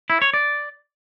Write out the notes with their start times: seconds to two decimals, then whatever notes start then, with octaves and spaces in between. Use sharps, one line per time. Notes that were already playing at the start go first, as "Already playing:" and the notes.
0.10 E4
0.22 C#5
0.34 D5